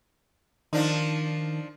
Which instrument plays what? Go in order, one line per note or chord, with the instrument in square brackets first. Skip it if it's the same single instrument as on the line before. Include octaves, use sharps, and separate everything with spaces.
[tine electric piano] D#3 [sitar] F3 D4 D#4